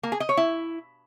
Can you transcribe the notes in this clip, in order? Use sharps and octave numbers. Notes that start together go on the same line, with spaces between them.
A#3
G#4
D#5
C#5
E4